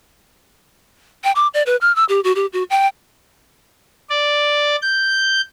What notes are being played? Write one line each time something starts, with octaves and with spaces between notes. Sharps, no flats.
G5
D6
D5
B4
F6
E6
G4
F#4
G4
F#4
G5
D5
G6